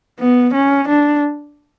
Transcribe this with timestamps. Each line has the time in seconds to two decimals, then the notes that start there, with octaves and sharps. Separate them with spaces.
0.19 B3
0.54 C#4
0.88 D4